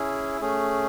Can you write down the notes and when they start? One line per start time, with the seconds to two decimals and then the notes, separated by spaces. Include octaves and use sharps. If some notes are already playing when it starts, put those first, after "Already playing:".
Already playing: C#4 E4 G#4
0.41 A3 C#4 G#4